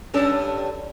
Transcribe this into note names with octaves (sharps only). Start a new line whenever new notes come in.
G2 C#4 A4